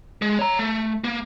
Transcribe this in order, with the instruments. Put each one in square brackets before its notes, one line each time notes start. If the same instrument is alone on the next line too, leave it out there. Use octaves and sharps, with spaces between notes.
[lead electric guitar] G#3
C#5 A#5
A3
A#3